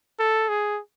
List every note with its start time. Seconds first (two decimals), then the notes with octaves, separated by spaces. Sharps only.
0.20 A4
0.49 G#4